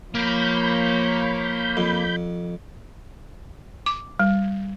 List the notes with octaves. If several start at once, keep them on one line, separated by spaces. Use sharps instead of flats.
F3 A#3 C#5 F5 B5 G6
F2
D6
G3